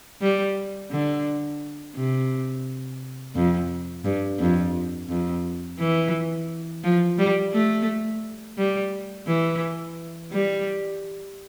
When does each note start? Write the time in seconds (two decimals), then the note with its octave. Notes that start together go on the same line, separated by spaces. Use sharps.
0.22 G3
0.91 D3
1.95 C3
3.35 F2
4.05 G2
4.40 F2
5.09 F2
5.79 E3
6.84 F3
7.18 G3
7.53 A3
8.58 G3
9.28 E3
10.32 G3